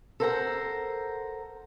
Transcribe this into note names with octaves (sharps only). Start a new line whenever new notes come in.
A4 A#4 C5 F#5 G#5 A#5